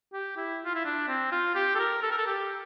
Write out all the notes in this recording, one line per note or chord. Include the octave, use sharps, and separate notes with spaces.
G4
E4
F4
E4
D4
C4
F4
G4
A4
A#4
A4
A#4
A4
G4